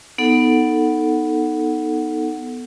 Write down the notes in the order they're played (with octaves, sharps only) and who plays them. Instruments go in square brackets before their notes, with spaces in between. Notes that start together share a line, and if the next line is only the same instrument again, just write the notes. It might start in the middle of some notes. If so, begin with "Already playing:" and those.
[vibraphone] B3 D#4 A4 F#5